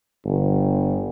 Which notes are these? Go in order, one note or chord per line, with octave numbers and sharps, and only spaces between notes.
G1